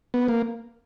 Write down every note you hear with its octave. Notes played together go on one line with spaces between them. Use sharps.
B3
A#3